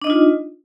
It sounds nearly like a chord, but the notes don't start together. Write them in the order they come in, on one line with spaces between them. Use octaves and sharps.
D4 D#5 D#4 F4